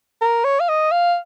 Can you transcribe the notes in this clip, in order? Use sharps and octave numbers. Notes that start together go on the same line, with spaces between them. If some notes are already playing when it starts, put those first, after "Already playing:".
A#4
C#5
F5
D#5
F5